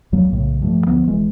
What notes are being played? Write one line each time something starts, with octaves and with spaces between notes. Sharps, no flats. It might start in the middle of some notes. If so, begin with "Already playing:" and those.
D#2 F#3 G3 A#3
B1 A2 C#3
G2 F3 A3
D2 F3 B3
E1 E3 G#3